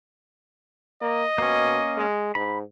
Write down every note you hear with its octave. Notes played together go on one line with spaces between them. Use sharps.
A#3 D#5
B2 A#3 C#4
G#3
G#2 B5